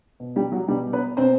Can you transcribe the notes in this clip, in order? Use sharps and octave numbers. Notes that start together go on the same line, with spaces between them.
B2
G3 G4
F#3 F#4
B2 G3 G4
B3 B4
B2 C4 C5